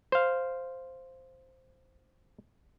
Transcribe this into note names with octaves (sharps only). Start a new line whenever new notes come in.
C5 F5